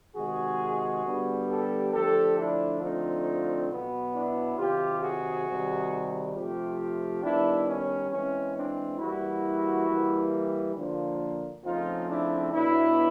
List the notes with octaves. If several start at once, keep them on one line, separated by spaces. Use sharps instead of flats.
C3 D#3 G#3 F#4 G#4
D3 G3 B3
G4 A4
D3 F3 A3 G4 A4
D4 E4
D3 F3 A3 C4 D#4 F4
B2 F#3 B3
D4 E4
C3 D#3 F#3 F4 G4
F#4 G#4
C3 D#3 G3
C3 F3 A3 F4 G4
D#3 G3 B3 D4 E4
C#4
E3 G#3 C4 C#4
C4 D4
E3 G3 A#3 E4 F#4
E3 G3 A#3
D3 F3 A#3
C#3 F3 A3 C4 D#4 F4
D4 E4
B2 F#3 B3 D4 E4